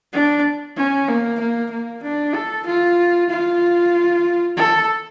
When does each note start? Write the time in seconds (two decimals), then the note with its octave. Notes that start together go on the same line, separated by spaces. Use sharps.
0.13 D4
0.76 C#4
1.08 A#3
1.40 A#3
1.70 A#3
2.03 D4
2.34 A4
2.66 F4
3.29 F4
4.56 A4